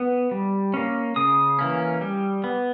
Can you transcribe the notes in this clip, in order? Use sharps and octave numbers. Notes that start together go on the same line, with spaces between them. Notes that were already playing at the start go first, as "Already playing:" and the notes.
Already playing: B3
G3
A#3 C#4
C#3 D#6
E3 A#3 C#4
G3
B3